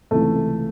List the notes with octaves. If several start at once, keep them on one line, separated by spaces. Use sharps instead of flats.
C#2 C3 E3 A3